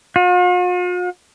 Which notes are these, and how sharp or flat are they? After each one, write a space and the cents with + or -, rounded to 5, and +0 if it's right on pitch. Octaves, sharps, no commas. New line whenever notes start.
F4 +45